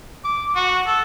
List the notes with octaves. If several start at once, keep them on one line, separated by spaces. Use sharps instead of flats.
D6
F#4
A4